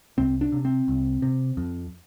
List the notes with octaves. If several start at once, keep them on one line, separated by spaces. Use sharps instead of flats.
C2 C4
D4
C3
C4
C2
C3
F2